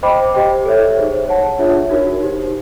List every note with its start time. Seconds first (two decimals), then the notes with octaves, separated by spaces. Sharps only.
0.03 C5 D#5 G5 B5 D6
0.34 G4 C5 D#5 G5
0.66 A4 C#5 E5
0.96 D#4 G#4 C5
1.27 C#5 F#5 A5
1.59 D4 F4 G#4 C#5 E5
1.90 D#4 F#4 A#4 C#5
2.21 D#4 G4 C5